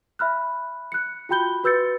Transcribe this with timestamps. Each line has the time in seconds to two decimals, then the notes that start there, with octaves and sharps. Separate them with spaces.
0.19 E5 B5 F6 F#6
0.92 F#6 C#7
1.29 F4 F#4 G5 B5 G6 G7
1.64 F#4 B4 E6 G6 A6 C#7